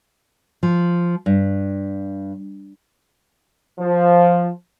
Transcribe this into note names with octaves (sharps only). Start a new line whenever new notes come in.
F3
G2
F3